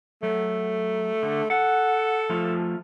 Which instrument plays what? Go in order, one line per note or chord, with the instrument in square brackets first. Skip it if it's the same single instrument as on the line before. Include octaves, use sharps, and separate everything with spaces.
[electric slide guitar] F#3 [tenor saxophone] A3
[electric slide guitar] D3
[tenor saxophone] A4 [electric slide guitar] F#5
[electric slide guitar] F3 A3 F4